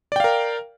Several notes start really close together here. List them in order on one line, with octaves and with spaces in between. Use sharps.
D5 G5 F5 A#4